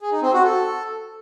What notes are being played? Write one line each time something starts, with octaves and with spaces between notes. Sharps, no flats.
G#4
D#4
C4
F#4
A4